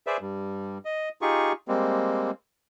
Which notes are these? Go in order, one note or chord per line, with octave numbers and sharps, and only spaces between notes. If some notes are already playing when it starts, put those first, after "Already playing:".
G#4 B4 C5 D5 E5
G2 G3
D#5
D#4 F4 G4 G#4 C#6
G3 G#3 A#3 C4